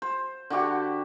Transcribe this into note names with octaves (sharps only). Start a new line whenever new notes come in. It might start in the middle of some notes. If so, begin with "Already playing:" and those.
C5
D3 F#4 G4 F#5